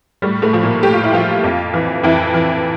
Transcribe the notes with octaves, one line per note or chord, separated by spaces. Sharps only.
A2 G3
A2 A3
F3
A#2 A#3
A2 G4
F4
E4
F3 F4
F2
E3
F2 E3 E4
E3